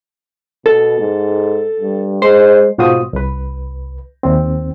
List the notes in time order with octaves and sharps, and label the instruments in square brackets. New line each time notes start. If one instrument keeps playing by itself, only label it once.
[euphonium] B2 [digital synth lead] A4
[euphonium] G#2
G2
[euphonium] G#3 [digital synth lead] C5
[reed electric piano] G#2 B2 F4 F#4 C5 D#6
C2 B4
D#2 C4